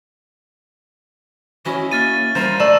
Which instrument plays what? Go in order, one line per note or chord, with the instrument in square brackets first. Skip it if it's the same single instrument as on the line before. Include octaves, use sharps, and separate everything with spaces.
[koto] C#4 E4 D#5 [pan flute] F#4
[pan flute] A#3 [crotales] F6 A6 D#7
[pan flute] G3 [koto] F4 A#4 C5
[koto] A3 [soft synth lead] D5 [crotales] E6 A6 E7